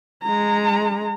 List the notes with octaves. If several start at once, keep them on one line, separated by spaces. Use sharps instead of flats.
G#3 A#5